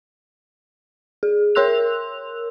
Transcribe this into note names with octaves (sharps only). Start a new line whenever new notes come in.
G#4
A#4 C#5 C6 E6 F#6 F7